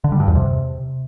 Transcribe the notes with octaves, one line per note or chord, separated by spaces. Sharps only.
D3
G3
G2
E2
C3